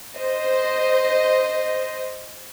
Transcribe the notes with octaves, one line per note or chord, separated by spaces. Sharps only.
C5 D#5